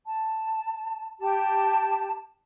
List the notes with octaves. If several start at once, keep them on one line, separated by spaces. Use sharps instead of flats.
A5
G4 A5